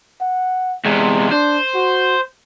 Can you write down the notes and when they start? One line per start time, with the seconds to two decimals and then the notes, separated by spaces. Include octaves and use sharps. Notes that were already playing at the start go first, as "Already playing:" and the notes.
0.21 F#5
0.85 E2 C3 G#3
1.32 D4 C5
1.75 F#4